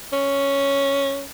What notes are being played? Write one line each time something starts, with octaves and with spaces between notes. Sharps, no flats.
C#4